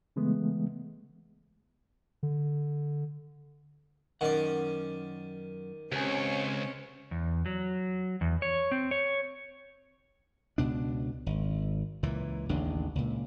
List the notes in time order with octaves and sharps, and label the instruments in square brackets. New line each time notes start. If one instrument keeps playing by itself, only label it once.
[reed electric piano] C#3 E3 G#3 A3 B3
[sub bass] D3
[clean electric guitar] F#2 C#4 F#5 [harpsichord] D#3 D5
[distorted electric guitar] C#2 [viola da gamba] C4 C#4 C#5 [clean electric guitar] G4 G#5
[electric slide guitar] E2
F#3
E2
C#5
C4
C#5
[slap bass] C#2 B2 D4
G#1
C#2 A#2 E3
A1 D#2 C#3 D4
C#2 A#2